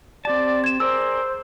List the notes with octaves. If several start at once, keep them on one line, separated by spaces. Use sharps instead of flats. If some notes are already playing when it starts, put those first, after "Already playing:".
C4 G4 D5 A5
G#6 E7
G#4 A#4 C5 D5 E6